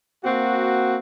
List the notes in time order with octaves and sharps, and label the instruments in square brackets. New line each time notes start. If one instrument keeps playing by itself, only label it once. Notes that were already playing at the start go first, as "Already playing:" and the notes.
[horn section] A#3 C4 F#4